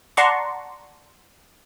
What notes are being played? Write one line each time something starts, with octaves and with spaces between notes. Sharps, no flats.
D5 F#5 A5 A#5 C6 C#6